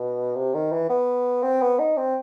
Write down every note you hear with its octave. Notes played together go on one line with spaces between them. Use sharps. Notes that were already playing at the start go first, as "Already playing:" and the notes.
Already playing: B2
C3
D#3
E3
B3
C4
B3
D#4
C4